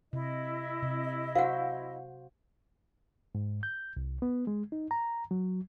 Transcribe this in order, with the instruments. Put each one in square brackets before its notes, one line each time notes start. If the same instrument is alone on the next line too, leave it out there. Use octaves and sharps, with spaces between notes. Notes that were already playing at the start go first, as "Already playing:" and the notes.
[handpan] C3 [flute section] E4 D#5
[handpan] C3
[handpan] F#4 C5 [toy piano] F5 F#5
[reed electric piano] G#2
G6
C2
B3
G#3
D#4
A#5
F#3